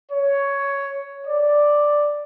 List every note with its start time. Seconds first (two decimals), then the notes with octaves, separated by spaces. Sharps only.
0.11 C#5
1.27 D5